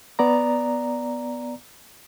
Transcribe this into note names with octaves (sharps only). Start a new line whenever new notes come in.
B3 D5 A#5